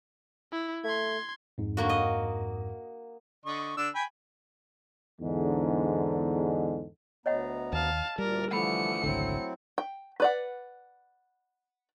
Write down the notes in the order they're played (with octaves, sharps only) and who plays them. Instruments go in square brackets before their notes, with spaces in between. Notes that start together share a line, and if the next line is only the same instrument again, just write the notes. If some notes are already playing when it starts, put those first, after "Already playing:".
[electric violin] E4
[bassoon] A3 [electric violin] C6 G#6
[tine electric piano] F2 G#2
[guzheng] D3 A#3 F#4
D#5
[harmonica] D3 D#5 C#6
D3 D4 E6
G5 G#5 B5
[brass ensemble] E2 G#2 D3
[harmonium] D2 B3 A#5 [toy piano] C#5 D#5 F#5
[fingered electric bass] D#2 [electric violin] F5 A5
[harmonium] D2 A#2 D5 [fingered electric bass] G3 [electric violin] A#4
[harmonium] D3 E3 F3 [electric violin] A3 C#7 [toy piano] F#5 B5
[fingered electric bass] G#1 C#2 D3 [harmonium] F#3 C4 E4
[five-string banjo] G5
B4 D5 F#5